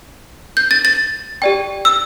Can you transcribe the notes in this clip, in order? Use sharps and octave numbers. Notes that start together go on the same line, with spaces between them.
G6
A6
A6
G4 D5 G5
E6